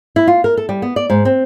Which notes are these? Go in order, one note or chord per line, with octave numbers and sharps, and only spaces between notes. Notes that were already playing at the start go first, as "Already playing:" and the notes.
E4
F4
A#4
A4
G3
B3
D5
G#2
C4